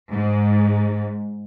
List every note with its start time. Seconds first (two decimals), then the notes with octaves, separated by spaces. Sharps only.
0.12 G#2